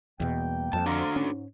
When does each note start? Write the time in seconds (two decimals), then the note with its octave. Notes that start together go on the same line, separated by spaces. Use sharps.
0.20 E2 B2 G3 A#3 G5
0.73 F2 A5
0.86 D4 F#4 A4 C5 F5 A#5
1.16 G#2 C#4